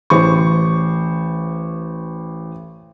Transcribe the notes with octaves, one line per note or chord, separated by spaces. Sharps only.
A1 C5 C#6